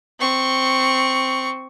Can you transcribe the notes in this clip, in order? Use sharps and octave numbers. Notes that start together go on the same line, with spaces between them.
C4 C#6